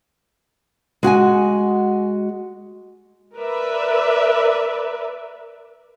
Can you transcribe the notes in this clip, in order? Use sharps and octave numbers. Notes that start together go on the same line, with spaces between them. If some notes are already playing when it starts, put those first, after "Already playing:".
G#3 F#4 F#5 G#5
A#4 B4 D5 E5